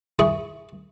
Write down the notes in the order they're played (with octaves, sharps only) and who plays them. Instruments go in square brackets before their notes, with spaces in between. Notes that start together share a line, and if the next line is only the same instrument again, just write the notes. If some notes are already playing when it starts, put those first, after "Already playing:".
[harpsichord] E4 G#4 C#6